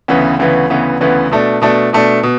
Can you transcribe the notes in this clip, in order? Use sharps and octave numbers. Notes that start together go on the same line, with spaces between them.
D2 C#3 E3 B3
D2 C#3 E3 B3
D2 C#3 E3 B3
D2 C#3 E3 B3
B2 A3 D4
B2 A3 D4
B2 A3 D4
B2